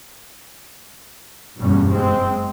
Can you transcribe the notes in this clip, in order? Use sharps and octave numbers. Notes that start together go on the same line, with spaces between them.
F#1 E2 G2 B2 G3 C#4
F#1 G#3 C4